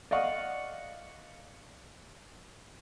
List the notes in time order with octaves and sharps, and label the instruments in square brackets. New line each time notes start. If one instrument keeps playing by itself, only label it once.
[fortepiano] D5 D#5 F5 F#5 C#6